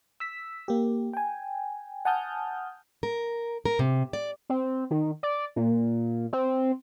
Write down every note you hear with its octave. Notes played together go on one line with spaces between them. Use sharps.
E6 B6
A#3 G4
G5 G#5
F#5 G#5 A5 D#6 F6 G6
A#4
A#4
C3
D5
C4
D#3
D5
A#2
C4